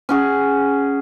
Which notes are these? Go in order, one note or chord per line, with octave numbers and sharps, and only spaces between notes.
C#4 F#4 G#4